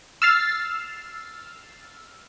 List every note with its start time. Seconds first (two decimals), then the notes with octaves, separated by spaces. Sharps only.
0.22 E6 F6 A6 C7